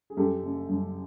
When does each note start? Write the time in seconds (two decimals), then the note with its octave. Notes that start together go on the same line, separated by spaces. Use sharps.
0.10 G#4
0.17 F#2 G4 A4
0.43 F#1
0.69 F#2